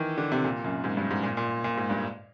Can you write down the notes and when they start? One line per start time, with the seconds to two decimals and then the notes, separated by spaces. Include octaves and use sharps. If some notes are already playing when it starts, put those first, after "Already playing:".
Already playing: D#3 E3
0.18 D3
0.32 C3
0.44 A#2
0.64 F#2
0.84 G#2
0.97 G2
1.11 G#2
1.23 A#2
1.37 A#2
1.64 A#2
1.77 G#2
1.90 G2